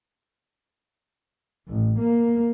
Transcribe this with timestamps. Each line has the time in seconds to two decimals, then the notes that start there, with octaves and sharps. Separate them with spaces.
1.68 A1
1.98 A#3